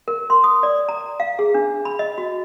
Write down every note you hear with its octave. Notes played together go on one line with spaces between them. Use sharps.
A#4
C6
D#6
D5
A#5
F5
G#4
D4
B5
D#5
F#4